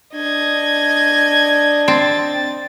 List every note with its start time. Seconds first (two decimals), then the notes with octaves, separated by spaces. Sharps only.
0.15 D4 D#5 G#6
1.88 C4 A6